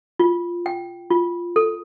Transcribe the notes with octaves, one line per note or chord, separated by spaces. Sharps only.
F4
G5
F4
A4